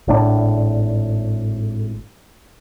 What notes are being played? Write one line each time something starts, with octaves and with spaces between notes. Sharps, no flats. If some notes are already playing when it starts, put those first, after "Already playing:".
G#1 A2 D4